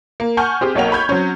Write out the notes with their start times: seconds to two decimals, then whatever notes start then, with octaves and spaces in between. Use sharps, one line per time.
0.20 A#3
0.37 F#5 G#5 A5 C#6 F6 G6
0.61 C4 G4 G#4
0.75 B1 A#3 C#5 F#5 G5 F7
0.92 B5 C#6 G6 G#6
1.09 F#3 C4 C#4